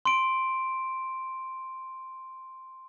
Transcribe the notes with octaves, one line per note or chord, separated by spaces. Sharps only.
C6 D7